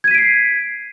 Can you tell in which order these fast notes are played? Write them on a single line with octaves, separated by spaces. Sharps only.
G#6 D#7 B6 D7 C7